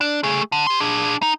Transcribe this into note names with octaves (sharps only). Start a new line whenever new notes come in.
D4
A3 G#4
D3
G4 C6
D4 G#4
D#4